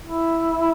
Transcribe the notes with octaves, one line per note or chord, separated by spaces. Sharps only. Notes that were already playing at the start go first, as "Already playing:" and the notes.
E4